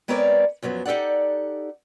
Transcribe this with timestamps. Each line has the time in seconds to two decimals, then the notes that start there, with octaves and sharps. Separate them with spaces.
0.08 G#3 B3 C4 A#4 C#5 D5
0.63 F#2 F3 F#3 B3
0.86 D#4 G4 A4 D5 F#5